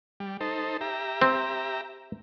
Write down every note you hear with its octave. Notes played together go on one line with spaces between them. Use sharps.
G3
D#4 A4 C5
G4 E5 A#5
C4